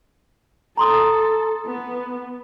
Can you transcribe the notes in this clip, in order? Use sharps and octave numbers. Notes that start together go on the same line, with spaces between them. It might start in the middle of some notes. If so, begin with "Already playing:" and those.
A4 A#5 C6 D#6
B3